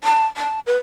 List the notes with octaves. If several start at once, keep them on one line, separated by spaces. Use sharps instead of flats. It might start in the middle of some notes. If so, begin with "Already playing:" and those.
A5
A5
B4